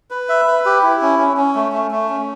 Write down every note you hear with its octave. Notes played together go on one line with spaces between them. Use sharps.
B4
E5
B4
G4
E4
C#4
C#4
C#4
A3
A3
A3
C#4